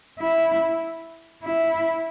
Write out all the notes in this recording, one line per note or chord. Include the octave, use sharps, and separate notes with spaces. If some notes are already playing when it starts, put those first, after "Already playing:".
E4
E4